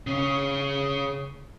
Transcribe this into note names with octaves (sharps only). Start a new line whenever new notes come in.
C#3 C#4